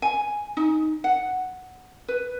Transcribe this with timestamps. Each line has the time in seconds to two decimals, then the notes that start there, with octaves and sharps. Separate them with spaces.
0.02 G#5
0.57 D#4
1.04 F#5
2.08 B4